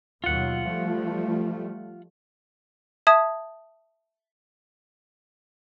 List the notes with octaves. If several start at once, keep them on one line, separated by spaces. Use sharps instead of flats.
D#2 B2 F#3 F4 F#5
F3 G3 A3
E5 A5 D#6 G#6